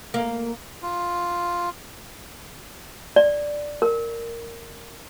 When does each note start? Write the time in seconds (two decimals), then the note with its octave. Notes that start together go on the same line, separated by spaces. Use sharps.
0.14 A#3
0.82 F4
3.16 D5
3.82 A#4